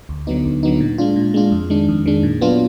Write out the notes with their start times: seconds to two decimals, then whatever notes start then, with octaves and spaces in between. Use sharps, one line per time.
0.09 D2
0.27 D3 F#3 B3 D#4
0.45 D2
0.63 D3 F#3 B3 D#4
0.80 A#2
0.98 G#3 D4 F4
1.16 A#2
1.34 G#3 D4 F4
1.52 F2
1.70 D#3 G#3 D4
1.89 F2
2.06 D#3 G#3 D4
2.23 A#2
2.41 F#3 B3 D4 F4